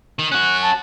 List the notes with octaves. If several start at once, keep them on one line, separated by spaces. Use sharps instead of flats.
D#3
C#4 F#4 F#6
A5